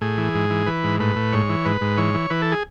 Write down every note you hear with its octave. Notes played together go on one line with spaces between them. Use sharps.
A2 G#4
E3
G#2
E3
E3 B4
G#2
A2 B4
A2
G#2 C#5
E3
G#2 B4
G#2
E3 C#5
E3
E3 B4
A4
G#4